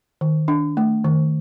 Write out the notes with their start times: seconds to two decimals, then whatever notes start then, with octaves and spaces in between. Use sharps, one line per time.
0.21 D#3
0.48 D4
0.77 A3
1.05 D#3